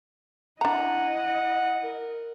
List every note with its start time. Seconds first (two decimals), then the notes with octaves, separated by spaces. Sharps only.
0.61 D4 E4 D#5 F#5 A#5
1.16 F#5
1.84 A#4